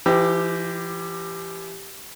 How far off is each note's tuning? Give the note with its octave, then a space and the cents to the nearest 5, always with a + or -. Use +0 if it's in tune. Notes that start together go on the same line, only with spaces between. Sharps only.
E3 +45 E4 -25 G4 +0